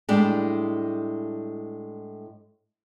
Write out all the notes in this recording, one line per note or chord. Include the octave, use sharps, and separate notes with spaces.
A2 G3 G#3 D4